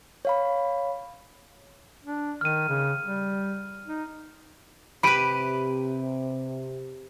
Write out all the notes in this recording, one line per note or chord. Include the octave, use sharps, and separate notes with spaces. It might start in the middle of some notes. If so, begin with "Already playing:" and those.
C#5 F5 B5
D4
D#3 F6 D#7
C#3
G3
D#4
C3 G4 B4 B5 D7 D#7